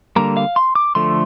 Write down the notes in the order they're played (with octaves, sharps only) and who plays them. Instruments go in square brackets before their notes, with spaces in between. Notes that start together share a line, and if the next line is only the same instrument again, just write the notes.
[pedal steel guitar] D3 G3 A#3 A#5
F5
C6
D6
D3 F3 A3 C6